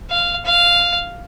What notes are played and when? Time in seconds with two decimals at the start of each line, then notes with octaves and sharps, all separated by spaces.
0.10 F5
0.45 F5